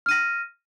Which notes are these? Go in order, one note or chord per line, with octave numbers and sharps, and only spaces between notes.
F6 A#6 D#7